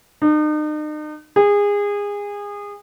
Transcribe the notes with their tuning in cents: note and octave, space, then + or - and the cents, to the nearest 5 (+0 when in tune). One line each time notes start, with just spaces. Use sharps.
D#4 -40
G#4 -25